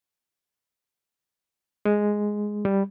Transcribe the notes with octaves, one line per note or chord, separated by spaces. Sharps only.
G#3
G3